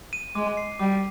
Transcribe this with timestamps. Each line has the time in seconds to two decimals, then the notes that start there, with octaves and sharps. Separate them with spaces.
0.13 D#7
0.35 G#3 D6
0.57 C7
0.79 G3 D6